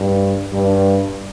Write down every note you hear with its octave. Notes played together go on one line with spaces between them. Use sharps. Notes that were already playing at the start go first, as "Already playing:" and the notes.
Already playing: G2
G2